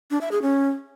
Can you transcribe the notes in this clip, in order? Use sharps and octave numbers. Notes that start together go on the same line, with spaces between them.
D4
E5
G#4
C#4